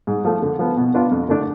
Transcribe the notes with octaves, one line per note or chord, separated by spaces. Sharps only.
G#2
F3 A3
D3
F3 B3
B2
B3 D4 F4
F2
D3 A3 D4